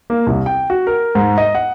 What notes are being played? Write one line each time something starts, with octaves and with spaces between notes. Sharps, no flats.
A#3
C2
G5
F#4
A#4
G#2
D#5
F#5